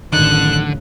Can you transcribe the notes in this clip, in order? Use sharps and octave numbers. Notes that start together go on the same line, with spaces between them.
A1 F#2 D3 D#3 F#6